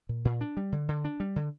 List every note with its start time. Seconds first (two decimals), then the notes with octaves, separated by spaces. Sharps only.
0.09 A#2
0.25 A#2
0.41 D4
0.57 G3
0.72 D3
0.88 D3
1.05 D4
1.20 G3
1.36 D3